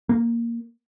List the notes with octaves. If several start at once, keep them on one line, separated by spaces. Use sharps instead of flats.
A#3